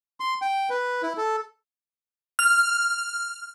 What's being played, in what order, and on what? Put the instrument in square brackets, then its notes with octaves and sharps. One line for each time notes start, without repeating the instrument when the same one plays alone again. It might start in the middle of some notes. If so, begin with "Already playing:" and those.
[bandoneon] C6
G5
B4
E4
A4
[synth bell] F6